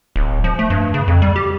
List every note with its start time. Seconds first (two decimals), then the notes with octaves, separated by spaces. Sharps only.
0.16 D1
0.44 F3
0.59 A3
0.70 G2
0.94 C#3
1.08 F2
1.22 G3
1.36 G4